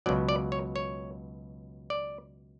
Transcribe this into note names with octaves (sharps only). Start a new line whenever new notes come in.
C#2 B2 F#3 D5
D5
C#5
C#5
D5